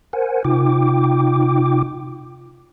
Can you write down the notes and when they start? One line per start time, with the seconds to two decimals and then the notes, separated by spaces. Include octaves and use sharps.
0.13 A#4 C5 F#5 G#5
0.45 C3 D#4 F4 G5 D6